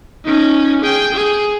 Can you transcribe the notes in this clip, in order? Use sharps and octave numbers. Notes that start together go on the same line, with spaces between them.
C#4 D#4
G#4 G5
G#4